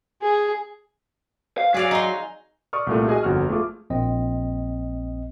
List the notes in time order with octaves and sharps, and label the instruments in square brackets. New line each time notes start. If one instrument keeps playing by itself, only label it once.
[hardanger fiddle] G#4
[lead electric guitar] F5
[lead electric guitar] F#3 [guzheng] G#4 D5 F5
[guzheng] D#4 C6
[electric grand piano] D5 C#6 D#6 F6
C2 A#2 A3
F#4 G#4 D#5 G#5
G1 F2 F#4 F6
A3 F4 G#4 D6
[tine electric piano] A#1 C4 D#5